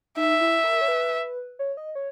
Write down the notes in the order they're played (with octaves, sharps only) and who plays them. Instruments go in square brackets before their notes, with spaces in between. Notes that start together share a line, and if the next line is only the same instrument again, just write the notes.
[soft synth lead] D#4 [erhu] E5
[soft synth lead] E4
A#4
C#5
B4
C#5
D#5
C#5